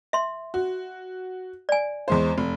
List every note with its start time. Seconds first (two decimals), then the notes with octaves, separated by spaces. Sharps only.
0.13 E5 C6
0.54 F#4
1.69 D5 G#5
2.08 E2 G#3 C5
2.38 F1